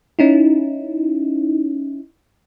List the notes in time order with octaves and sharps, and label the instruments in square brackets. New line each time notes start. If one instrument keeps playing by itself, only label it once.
[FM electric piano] C#4 D#4 E4